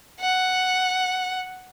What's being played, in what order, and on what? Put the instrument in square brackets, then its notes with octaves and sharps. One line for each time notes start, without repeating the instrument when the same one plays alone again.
[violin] F#5